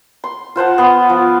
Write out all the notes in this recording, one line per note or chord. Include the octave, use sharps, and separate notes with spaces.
C6
F4 C5 F#5 A5
B3 C6
F3